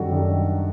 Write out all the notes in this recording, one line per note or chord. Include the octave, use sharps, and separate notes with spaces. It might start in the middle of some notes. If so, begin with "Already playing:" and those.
Already playing: F#2 D#3 G3 D4 F#4 A4
F#2 D#3 G3 D4